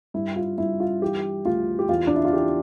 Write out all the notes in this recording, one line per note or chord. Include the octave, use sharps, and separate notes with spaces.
G2 E4
F4
G2 E4
F4
E3 G4
D2 F4
G4
E2 F4
D4
E4
F4
E3 G4